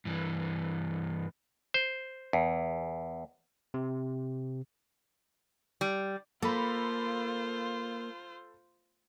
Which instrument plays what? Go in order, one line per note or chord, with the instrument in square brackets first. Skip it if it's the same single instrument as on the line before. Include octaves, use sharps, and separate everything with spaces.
[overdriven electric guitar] G2 E3
[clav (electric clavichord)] C5
E2
[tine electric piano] C3
[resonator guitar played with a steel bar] G3
[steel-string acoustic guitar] A#3 [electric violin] F4 C5 [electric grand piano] A4 B5